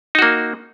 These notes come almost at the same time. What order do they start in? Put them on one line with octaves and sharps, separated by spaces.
D#4 F#4 A#3